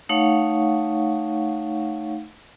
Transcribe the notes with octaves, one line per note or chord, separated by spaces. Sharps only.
A3 D#4 C#5 F5 F#5 C#6